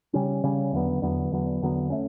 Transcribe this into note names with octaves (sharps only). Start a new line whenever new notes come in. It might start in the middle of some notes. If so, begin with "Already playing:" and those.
C#3 G3 C#4
C#3 G3 C#4
E2 D3 F#3 B3
E2 D3 F#3 B3
E2 D3 F#3 B3
E2 D3 F#3 B3
A3 C#4